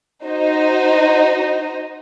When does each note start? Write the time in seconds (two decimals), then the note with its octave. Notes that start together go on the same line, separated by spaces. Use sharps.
0.23 D#4 F#4 C5 D#5